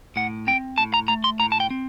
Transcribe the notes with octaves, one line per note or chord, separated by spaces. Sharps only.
A2 F#5
C4 G5
A2 A5
A#5
A3 A#5
C6
A2 A#5
A5
G5
C4